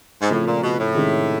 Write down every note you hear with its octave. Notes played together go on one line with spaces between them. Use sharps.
G#2
A2 C#3 F3 A3 C4
A#2
B2
A2
C3 D#3 G#3 C#4 E4